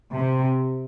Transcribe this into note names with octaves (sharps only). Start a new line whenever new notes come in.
C3